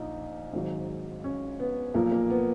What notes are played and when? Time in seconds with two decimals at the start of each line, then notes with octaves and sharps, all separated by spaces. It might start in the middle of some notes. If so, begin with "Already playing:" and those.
Already playing: A#1 A#2 F3 D#4
0.53 G#1 G#2 F#3
1.24 C#4
1.60 B3
1.94 B1 A#2 F3 A#3
2.12 A#3
2.30 B3